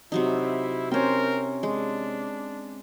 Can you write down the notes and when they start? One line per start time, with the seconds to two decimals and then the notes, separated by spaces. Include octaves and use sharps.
0.12 C3 F#3 D#4 E4
0.91 C4 C#4 A#4 C5 G5
1.63 G#3 D4